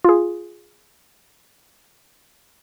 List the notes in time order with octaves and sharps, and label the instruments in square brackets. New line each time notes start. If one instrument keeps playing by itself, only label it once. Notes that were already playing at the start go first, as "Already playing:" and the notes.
[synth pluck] F4 G#4